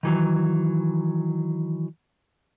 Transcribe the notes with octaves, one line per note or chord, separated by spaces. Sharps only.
D#3 E3 F#3